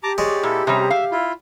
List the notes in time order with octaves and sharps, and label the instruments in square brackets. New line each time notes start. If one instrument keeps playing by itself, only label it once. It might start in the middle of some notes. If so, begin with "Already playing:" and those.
[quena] G4 [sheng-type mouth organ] A5 A#5 D6
[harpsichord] G#3 [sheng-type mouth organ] C#5 D5
[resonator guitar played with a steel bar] A#2 [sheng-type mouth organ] E4 A4
[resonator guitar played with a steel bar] C3 G3 [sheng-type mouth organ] C#4 G#4 A#5
[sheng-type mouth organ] E5 [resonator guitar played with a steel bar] F5
[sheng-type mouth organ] E4 F4